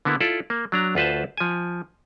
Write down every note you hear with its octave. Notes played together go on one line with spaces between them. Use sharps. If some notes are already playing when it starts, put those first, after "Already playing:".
D3 A#3 B3 E4
E4 F4 A4 D5
A#3
F#3 D4 A#5
D2 F4 B4 C5 A5
F3 G#5